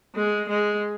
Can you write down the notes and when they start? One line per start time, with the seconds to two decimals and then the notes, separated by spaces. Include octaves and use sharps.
0.15 G#3
0.48 G#3